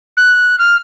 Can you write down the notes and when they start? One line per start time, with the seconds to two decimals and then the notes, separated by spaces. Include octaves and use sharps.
0.17 F#6
0.59 F6